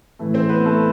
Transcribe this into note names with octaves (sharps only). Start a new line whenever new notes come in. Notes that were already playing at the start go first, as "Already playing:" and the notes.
A2 E3 A3
C4 C5
B3 B4
A3 A4